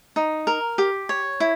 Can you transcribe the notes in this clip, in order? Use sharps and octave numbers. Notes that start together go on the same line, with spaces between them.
D#4
A#4
G4
C#5
E4